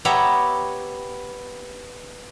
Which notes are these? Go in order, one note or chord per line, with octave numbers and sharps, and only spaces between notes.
B3 G4 C#5 E5 A#5